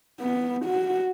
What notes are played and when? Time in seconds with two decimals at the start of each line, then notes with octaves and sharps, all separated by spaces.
0.20 B3
0.65 F#4